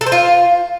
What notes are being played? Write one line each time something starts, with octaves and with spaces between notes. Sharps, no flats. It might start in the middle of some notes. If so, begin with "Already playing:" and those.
A4
C5
F4